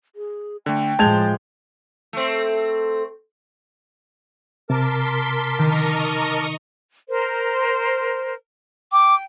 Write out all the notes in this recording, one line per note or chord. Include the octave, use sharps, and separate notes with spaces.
G#4
D3 A3 G5
A2 F3 G#3 A5 G6 G#6 F7
A3 C4
C3 A#4 A5 C6 D6 B6
D#3 D#5 A#5 C#6
A#4 C5
G5 D6